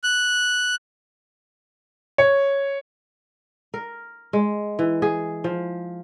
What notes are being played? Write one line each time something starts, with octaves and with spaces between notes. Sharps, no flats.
F#6
C#5
A#4
G#3
E3
G#4
F3